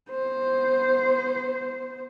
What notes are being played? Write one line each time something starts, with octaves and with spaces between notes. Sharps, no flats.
B3 C5